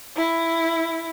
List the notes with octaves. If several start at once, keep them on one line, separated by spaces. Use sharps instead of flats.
E4